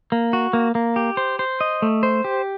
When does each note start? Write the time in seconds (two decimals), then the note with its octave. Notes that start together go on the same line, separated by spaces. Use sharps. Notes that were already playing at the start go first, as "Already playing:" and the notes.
0.12 A#3
0.33 F#4
0.53 A#3
0.75 A#3
0.96 G4
1.17 C5
1.39 C5
1.61 D#5
1.82 A3
2.03 C5
2.24 G4